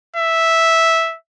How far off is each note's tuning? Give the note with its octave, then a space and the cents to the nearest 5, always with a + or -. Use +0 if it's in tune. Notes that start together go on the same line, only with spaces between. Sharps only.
E5 -5